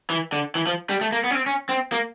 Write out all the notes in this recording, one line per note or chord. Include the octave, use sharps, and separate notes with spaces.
E3
D3
E3
F3
G3
A3
A#3
B3
C#4
C4
C#4
C4
A#3